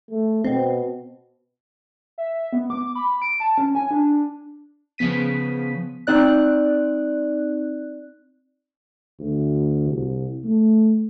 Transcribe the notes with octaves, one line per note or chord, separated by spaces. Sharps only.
A3
B2 C4
E5
B3
D6
B5
D7
A5
C#4
G#5
D4
C#3 F3 B3 B6 D#7
C4 D#4 D5 F#6
D2
C2
A3